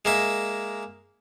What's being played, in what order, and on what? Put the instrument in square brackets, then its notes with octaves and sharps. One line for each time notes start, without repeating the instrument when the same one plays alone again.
[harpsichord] G#3 A#3 E5